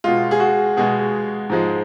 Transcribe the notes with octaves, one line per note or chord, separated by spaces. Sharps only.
B2 G#3 F4
G#4
F#4
B2 G#3 G#4
G#2 F3 G#3